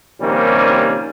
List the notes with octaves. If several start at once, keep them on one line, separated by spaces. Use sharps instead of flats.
A#1 C3 D#3 G3 A#3 C#4